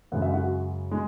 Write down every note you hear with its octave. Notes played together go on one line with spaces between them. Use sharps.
F#2 C#3 G#3 F#5
E5
F#4 F#5
G#3